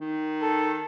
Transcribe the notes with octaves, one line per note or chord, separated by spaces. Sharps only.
D#3
A4